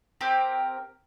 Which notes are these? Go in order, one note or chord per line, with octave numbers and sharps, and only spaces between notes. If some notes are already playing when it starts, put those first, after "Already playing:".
C4 G4 A#4